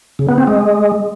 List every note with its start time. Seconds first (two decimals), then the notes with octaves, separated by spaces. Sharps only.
0.19 C#3
0.28 B3
0.38 C4
0.47 G#3